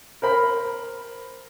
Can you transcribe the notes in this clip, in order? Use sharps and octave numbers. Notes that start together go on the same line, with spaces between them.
A#4 C5 B5